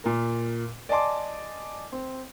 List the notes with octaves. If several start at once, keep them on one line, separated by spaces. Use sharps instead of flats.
A#2 A#4
D5 D#5 G#5 A5 C6 D6
C4